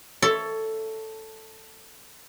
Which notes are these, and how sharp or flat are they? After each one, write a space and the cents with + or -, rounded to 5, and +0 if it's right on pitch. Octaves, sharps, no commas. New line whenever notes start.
A4 +5 C#5 +15 E5 +15